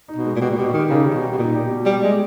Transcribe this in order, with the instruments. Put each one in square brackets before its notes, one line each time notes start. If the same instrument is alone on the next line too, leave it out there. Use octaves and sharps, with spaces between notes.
[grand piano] D#4
[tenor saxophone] B2
[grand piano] G#3
[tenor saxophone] A#2
[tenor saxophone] B2 [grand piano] G4
[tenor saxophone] A#2
[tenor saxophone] B2 [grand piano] G4
[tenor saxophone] D#3 [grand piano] G4
[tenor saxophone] C#3 [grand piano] D#4
[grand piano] G3
[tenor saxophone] B2
[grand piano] G3
[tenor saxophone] B2
[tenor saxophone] A#2 [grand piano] D#4
[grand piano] G4
B2
[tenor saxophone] G3 [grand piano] G4
[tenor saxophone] G#3 [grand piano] G4